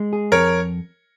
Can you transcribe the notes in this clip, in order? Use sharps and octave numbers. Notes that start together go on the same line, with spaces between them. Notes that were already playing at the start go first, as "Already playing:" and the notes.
Already playing: G#3
G#4
F2 A#4 C#5